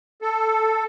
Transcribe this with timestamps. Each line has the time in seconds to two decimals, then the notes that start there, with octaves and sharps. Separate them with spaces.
0.22 A4